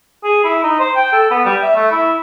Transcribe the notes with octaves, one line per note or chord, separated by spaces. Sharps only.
G#4
E4
D#4
C5
G5
A4
B3
G3
E5
A3
E4